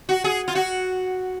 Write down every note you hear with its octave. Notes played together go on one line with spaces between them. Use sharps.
F#4
G#4
F4
F#4